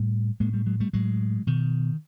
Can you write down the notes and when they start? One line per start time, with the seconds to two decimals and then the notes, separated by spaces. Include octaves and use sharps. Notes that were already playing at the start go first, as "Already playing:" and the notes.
Already playing: A2 G3 A3
0.40 A2 G#3 A#3
0.53 G3 A3
0.66 F#3 G#3
0.80 G3 A3
0.93 A2 F#3 G#3
1.47 B2 D#3